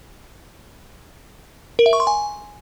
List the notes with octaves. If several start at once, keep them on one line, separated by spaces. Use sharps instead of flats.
A#4
E5
C#6
C6
G#5